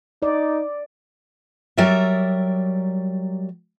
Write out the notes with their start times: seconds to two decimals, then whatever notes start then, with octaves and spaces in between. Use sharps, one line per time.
0.22 D#4 D5
1.78 F#3 G3 A#4 D5 E5